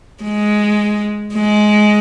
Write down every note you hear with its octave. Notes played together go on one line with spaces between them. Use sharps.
G#3
G#3